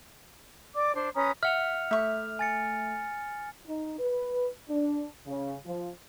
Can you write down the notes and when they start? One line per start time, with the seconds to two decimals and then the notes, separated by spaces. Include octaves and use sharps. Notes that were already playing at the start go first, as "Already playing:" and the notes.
0.75 D5 D6
0.95 D4 C5
1.15 C#4 B4 A#5 D#6
1.43 E5 F#5 F6 F7
1.91 A3 E5 C#6
2.39 G#5 A6 C#7
3.67 D#4
3.99 B4
4.69 D4
5.26 C#3
5.65 F3